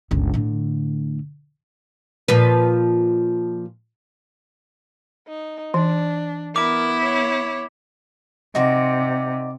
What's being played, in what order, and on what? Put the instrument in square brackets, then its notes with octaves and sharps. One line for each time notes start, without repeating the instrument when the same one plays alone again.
[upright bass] G1 C#2
A2 D3
[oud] A#2 F3 B4
[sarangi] D#4
[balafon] E3 [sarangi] D4
[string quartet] B3 E4 [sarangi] A#4 [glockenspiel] D6
[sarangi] C#5
[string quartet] C3 [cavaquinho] D#4 F#4 D5